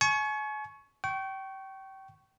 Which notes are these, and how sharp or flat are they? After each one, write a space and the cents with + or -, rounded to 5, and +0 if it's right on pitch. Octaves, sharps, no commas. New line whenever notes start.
G#5 +40 C#6 +0
G5 -30 C#6 +0